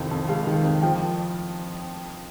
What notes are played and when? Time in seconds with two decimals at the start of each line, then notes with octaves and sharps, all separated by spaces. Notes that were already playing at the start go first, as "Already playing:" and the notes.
Already playing: C2 F2 D#3
0.11 F2
0.29 G#3 F5
0.47 D#3
0.64 F2
0.82 F3 G5